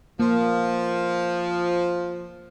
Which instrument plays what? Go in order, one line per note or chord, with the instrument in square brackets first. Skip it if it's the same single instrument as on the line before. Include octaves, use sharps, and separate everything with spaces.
[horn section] F3 [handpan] A#3